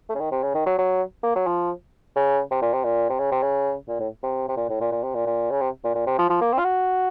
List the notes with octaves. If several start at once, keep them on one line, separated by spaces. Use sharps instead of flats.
A3
C#3
D#3
C3
C#3
D#3
F#3
F#3
A#3
F#3
F3
C#3
C3
A#2
C3
A#2
C3
C#3
C3
C#3
A#2
A2
C3
C3
A#2
A2
A#2
A#2
C3
A#2
A#2
C#3
C3
A#2
A#2
C3
F3
F3
A#3
C4
F4
F#4